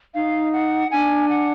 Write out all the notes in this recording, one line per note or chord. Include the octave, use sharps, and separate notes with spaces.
D#4 F5
F#5
D4 G#5
F#5